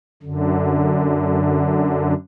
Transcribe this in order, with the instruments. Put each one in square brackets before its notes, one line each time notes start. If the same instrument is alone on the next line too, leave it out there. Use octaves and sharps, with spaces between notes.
[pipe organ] F#2 D3